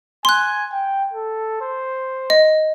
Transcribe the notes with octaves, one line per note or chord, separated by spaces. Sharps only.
G#5 C6 F#6
G5
A4
C5
D#5